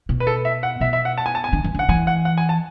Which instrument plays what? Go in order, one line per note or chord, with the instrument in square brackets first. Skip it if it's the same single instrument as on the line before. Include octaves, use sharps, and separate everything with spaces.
[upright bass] B2
[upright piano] B4
A4
E5
F#5
[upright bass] B2 [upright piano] E5
[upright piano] E5
F#5
A5
G#5
A5
G#5
[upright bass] D3
E3
[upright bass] D3 [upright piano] F#5
[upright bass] E3 [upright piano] G#5
[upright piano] F#5
F#5
G#5
A5